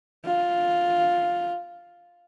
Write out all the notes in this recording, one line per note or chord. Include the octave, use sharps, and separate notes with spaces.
F4